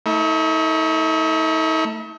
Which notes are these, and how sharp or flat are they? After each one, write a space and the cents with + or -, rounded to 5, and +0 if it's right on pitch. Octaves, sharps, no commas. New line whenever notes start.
A3 +15 D#4 +45